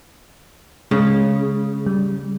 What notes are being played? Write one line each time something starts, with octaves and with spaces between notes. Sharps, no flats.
C#3 G#3
G3